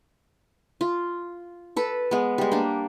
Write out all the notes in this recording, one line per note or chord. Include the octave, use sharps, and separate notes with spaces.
F4
A4 B4
G#3 B3
G3 G#3
A#3 D4